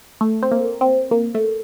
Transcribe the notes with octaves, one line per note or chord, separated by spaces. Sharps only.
A3
C4
A#3
C4
A#3
A3